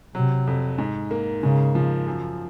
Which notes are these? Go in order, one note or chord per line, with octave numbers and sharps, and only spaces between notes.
C3 F#3
F2
G#2
A#3
G#2 C#3
F3
F#2